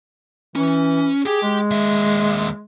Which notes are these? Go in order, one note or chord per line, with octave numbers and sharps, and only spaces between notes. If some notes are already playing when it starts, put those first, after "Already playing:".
E3 C#4
G4 G#4 G5
G#3
D#2 E5